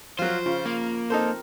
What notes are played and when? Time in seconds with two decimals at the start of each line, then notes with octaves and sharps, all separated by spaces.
0.19 F3 F#3 F4 C5 F5
0.46 C#3 F4
0.66 A#3
1.10 C4 D#4 A4 A#4 C5